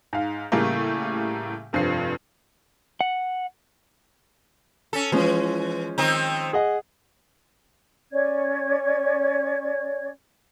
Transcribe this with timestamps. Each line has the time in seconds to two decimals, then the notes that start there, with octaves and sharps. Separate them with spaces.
0.13 G#2 F5
0.52 A2 C#3 G3 A3 A#3
1.73 F1 G2 F3 C7
3.01 F#5
4.93 C#4 A4
5.12 E3 F3 G#3 C#4
5.98 D#3 C4 D#4
6.53 G#4 D#5 F#5
8.12 C#4 C#5 D5 G#6